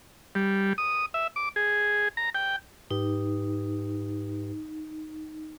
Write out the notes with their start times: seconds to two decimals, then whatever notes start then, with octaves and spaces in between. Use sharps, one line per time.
0.35 G3
0.78 D#6
1.14 E5
1.36 D6
1.56 G#4
2.17 A#5
2.35 G5
2.91 G#2 D#4 G4 B4